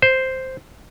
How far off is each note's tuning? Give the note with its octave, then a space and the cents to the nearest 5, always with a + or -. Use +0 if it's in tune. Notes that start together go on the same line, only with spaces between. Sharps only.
C5 +0